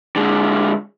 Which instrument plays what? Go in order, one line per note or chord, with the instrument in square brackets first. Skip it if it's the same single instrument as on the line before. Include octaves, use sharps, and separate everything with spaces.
[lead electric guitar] D3 G#3